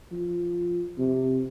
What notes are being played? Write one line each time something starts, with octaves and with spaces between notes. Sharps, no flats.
F3
C3